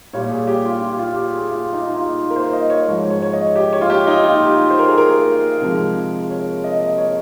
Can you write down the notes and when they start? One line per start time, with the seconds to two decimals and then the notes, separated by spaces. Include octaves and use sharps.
0.13 A#2 G3 C#5
0.30 G#4
0.47 G4
0.65 F4
0.82 F4
0.92 G4
0.99 F4
1.16 G4
1.33 G#4
1.51 F4
1.73 D#4
1.86 D#4
1.96 F4
2.30 A#4
2.36 C5
2.53 D#5
2.70 C#5
2.87 G#2 F3 G#3
3.11 C#5
3.22 C#5
3.33 D#5
3.56 G4
3.73 C#5
3.81 F4
3.90 G4
4.07 D#4
4.24 F4
4.47 G4
4.71 C5
4.79 A#4
4.88 G#4
4.98 A#4
5.61 C3 F3 G#3
6.30 C#5
6.64 D#5
6.80 D#5
6.98 C#5